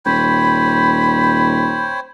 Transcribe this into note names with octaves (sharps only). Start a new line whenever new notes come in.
D#1 C5 C#5 G5 B5